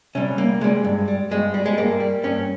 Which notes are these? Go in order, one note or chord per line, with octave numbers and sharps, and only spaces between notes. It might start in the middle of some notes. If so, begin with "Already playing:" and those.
C3 G3 C#4
C2 A#3
C3 G3 G#3
G2
G3
G2 G#3
G3
G#3
G2 A#3
G3
G2 C#4